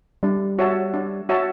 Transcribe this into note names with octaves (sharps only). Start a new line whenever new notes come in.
G3 D4
F#4 C#5 E5 A5
D4
F#4 C#5 E5 A5